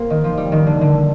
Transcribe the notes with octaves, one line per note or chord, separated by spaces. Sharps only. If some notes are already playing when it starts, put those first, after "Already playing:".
Already playing: A#3 C4
D#3
F3
G3
D#3
D3
D3